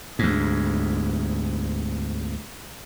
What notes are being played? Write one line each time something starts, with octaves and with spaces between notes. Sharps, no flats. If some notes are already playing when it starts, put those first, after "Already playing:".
D2 G#2